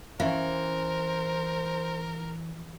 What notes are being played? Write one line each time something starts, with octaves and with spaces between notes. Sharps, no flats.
E3 C#4 A#4 C5 E5 F5